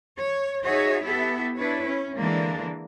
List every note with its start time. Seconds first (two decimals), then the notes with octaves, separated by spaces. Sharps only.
0.19 C#5
0.63 D#4 F#4 G#4 C#5 E5
1.04 B3 E4 G4 A4 E5
1.55 D4 E4 B4 C#5
1.85 C#4
2.17 D3 E3 G#3 A#3 D4